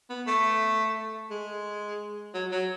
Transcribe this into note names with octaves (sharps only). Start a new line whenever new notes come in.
B3
A3
G#3
F#3
F#3